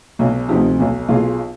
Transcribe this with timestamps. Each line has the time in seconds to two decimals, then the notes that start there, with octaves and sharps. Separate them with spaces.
0.19 B1 B2
0.49 D2 C3 F3 D#4 G4
0.79 B1 B2
1.09 B1 B2 F4 G#4